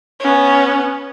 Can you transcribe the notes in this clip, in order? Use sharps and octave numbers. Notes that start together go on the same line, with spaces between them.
B3 C#4